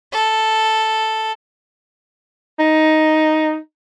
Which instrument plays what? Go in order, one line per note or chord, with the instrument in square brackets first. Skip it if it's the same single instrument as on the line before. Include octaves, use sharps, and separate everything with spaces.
[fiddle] A4
[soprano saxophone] D#4